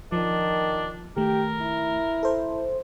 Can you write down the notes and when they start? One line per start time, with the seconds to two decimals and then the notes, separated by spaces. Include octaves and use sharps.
0.12 D#3 F3 D4
1.17 D#3 A3 G4 A#4
1.62 E4
2.23 A4 C5